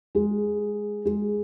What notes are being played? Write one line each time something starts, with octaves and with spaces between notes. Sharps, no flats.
G#3
G#3